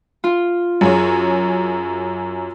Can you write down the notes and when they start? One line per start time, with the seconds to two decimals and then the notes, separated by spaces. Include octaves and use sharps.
0.24 F4
0.81 F#2 G#4 C#5